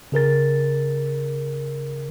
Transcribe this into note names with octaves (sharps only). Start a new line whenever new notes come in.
C#3 G#4 A#4 A6